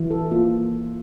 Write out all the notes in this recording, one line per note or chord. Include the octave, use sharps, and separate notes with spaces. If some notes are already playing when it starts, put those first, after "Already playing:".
Already playing: E3
A4
A#3 F4